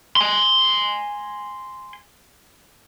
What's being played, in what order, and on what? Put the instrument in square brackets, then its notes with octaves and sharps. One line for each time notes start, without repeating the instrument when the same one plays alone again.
[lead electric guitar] G#5 C6